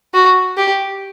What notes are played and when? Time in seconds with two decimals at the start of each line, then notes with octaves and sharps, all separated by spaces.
0.14 F#4
0.57 G4